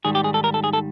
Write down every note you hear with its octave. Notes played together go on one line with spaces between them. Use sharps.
G#2 D#3 G3 G#4
G4
G#4
A4
A#4
A4
G#4
A4